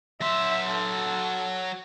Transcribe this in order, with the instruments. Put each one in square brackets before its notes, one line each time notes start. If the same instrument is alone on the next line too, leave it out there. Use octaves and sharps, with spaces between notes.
[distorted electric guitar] F#3 C6 [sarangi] E5
[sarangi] A4